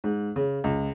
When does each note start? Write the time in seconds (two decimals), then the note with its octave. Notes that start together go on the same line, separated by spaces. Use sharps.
0.04 G#2
0.36 C#3
0.64 C#2